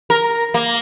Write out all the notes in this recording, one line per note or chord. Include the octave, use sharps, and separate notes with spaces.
A#4
A#3